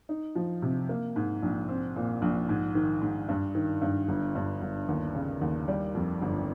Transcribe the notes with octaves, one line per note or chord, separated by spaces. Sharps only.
D#4
F3
C3
A#3
G#2
A#1
C4
A#2
A#1
G#2
D#3
G#2
G2
D#3
G2
G1
G2
G1
D#2
C#3
D#2
G3
F2
G1